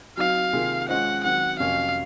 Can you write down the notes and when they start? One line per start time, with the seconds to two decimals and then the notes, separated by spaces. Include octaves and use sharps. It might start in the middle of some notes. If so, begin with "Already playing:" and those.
0.17 F#3 C4 D#4 F5
0.53 C3 D#3 A#3 F4 G#4
0.89 G#3 C#4 F4 C5 D#5 F#5
1.24 D#3 F#3 C4 F#5
1.59 F2 C3 F#3 A#3 C#4 F5